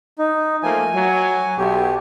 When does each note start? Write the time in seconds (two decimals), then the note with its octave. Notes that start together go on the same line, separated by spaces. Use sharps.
0.19 D#4
0.63 F3 A3 A#3 G#5
0.94 F#3
1.58 B1 G4